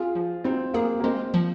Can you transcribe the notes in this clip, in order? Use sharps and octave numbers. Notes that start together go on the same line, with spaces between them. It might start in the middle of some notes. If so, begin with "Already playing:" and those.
Already playing: C4 F4 G#4
F3
C4 D#4
A#3 G#4
A#3
G#3 C4
F3